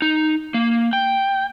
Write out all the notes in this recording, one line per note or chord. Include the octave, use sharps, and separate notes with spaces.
D#4
A#3
G5